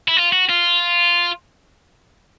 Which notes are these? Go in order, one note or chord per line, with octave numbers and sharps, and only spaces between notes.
E4
F4
F#4
F4